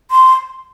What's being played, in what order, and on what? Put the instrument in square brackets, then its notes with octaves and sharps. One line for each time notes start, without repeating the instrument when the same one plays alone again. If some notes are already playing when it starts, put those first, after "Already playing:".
[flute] C6